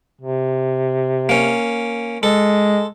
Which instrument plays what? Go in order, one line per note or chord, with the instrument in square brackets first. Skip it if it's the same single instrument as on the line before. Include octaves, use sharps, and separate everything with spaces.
[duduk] C3
[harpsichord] A#3 C#4
[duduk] G#3 [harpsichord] A4